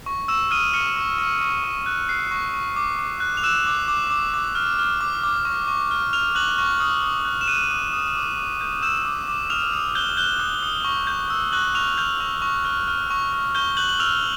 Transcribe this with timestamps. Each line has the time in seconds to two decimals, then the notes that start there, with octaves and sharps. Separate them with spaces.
0.06 C#6
0.28 C#6 E6 E7
0.51 D#6 F6 D#7
0.73 C#6 F6 C#7
0.96 C#6
1.18 C#6
1.41 C#6
1.64 C#6
1.86 F#6
2.09 F#6 C7
2.31 C#6
2.54 C#6
2.76 D6
2.99 D6
3.20 F#6
3.37 F7
3.43 E6 F#6 E7
3.66 D6
3.88 D6
4.10 D6
4.34 D6
4.55 F6
4.79 F6
5.01 D6
5.24 D6
5.45 C#6
5.68 C#6
5.91 F6
6.13 F6 F7
6.35 C#6 F#6 F#7
6.58 C#6
6.80 D#6
7.02 D#6
7.25 F#6
7.41 E7
7.48 D#6 F#6 D#7
7.70 D#6
7.93 D#6
8.15 D6
8.37 D6
8.61 G6
8.82 E6 G6 E7
9.05 D6
9.28 D6
9.50 D#6 F6 F7
9.73 D#6
9.95 F#6 G6 G7
10.17 F#6 G6 G7
10.40 D#6
10.63 D#6
10.85 C#6
11.07 G6
11.30 E6
11.52 C#6 F#6 F#7
11.74 C#6 F6 F7
11.97 F6 G6 F7
12.20 C#6
12.42 C#6
12.65 F6
12.88 F6
13.10 C#6
13.33 C#6
13.55 C#6 G6 G7
13.77 F#6 G6 F#7
13.89 F#7
13.99 E6 F6 F7